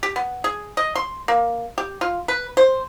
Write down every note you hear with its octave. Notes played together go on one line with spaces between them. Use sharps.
G4
B3
G#4
D#5
C6
A#3
G4
F4
B4
C5